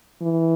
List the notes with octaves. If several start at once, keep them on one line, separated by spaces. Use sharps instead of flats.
E3